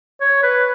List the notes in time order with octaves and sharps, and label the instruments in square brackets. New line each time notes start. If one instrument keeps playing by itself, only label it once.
[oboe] C#5
B4